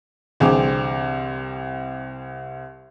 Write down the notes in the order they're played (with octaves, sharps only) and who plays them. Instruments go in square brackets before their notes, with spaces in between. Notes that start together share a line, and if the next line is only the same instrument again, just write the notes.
[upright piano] C2 C4 D6 [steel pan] D3 E3 G#4